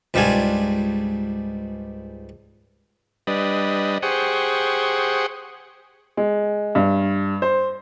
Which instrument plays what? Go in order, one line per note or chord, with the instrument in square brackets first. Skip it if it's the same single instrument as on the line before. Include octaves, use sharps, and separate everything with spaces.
[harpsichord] C#2 G#2 G3 D4 F4 G#5
[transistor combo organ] G3 D4 B4 D#5
G4 G#4 C5 F#5 C#6 D#6
[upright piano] G#3
G2
C5